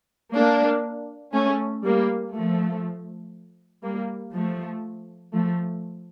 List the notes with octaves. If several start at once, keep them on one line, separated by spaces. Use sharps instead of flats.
A#3 D4
A3 C#4
G3 A#3
F3 A3
G3 A#3
F3 A3
F3 A3